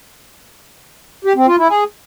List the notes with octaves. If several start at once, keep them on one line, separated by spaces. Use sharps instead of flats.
G4
C4
F4
E4
G#4